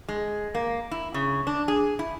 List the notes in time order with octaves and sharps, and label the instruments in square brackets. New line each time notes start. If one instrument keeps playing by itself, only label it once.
[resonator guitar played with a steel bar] G#3
A#3
E4
C#3
D4
G#4
E4